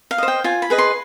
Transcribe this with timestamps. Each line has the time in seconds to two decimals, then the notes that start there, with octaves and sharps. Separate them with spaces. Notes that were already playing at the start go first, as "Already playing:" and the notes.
0.11 F5
0.18 C5 D#5
0.28 G5
0.44 F4 G#5
0.62 B5
0.70 G#4 B4 D#5
0.78 C6